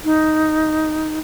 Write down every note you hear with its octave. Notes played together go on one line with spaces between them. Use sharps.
D#4